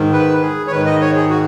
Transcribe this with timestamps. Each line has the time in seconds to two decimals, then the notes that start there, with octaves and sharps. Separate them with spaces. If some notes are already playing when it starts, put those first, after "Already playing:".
Already playing: G#2 D#3
0.13 B4
0.42 G#4
0.67 C#5
0.71 G#2 D#3 B4
0.86 D#5
1.01 C#5
1.16 G#4
1.30 F#4